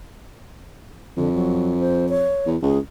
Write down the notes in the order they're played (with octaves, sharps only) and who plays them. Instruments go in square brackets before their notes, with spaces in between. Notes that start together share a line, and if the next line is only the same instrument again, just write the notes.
[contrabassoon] F2 [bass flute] D3
[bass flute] F#3
C5
C#5
[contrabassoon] E2
[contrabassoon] C#2 [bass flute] G#4